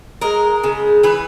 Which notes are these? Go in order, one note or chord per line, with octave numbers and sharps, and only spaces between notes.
G#3 A#4
C#3
E3 B4